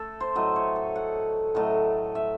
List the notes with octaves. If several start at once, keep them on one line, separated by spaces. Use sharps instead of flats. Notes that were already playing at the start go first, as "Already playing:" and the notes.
Already playing: A3 A4
C5
A2 F#3 A3 D#5
C#5
A4
F#5
A2 F#3 A3 D#5
E5